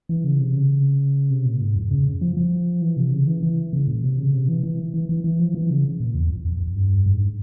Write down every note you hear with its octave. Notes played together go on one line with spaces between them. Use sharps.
E3
C#3
C3
C#3
C3
A#2
G#2
F2
C#3
F3
F3
E3
C3
C#3
E3
E3
C#3
A#2
C3
C#3
C3
E3
E3
E3
E3
E3
F3
E3
C#3
A#2
E2
F2
F2
F2
G2
G#2